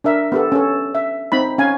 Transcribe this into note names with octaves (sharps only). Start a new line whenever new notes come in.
D4 A#4 E5
B3 G4 A4
C#4 A4
E5
C4 D#4 B5
C#4 F5 G#5